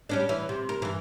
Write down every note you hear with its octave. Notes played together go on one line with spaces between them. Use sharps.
G3 C#4 D4
E3
C3
A#4
G2 E3